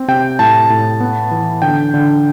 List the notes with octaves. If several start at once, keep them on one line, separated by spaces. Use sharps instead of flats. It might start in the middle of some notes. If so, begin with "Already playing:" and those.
Already playing: C4
C3 G5
A2 A5
A2
B3
E3
D3 G5
D3